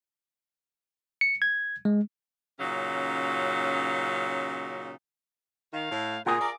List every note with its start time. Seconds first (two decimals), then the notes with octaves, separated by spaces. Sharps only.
1.21 C#7
1.42 G#6
1.85 G#3
2.59 A#2 C#3 F#3 C#4 D#4
5.73 D#3 F5
5.91 A2
6.26 A#2 F4 G#4 A#5
6.41 A#4 D5 D6